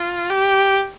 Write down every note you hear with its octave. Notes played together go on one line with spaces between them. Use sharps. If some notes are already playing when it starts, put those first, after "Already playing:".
Already playing: F4
G4